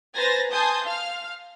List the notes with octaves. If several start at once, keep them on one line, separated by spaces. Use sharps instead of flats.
B4 C5 G#5 A#5 A6 A#6
G#5 A5 C6 D#6 G6
F5 F6